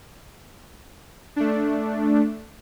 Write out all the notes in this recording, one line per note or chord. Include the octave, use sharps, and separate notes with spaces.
A3 D4